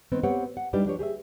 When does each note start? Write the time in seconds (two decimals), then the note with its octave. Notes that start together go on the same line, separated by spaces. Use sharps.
0.12 D#3 B3 C4
0.23 B3 C4 G4 C#5 F#5
0.57 F#5
0.73 G3 D4 D#4 G4 B4 D5
0.85 F3 D4 G4 C#5
0.99 G4 G#4 C#5 E5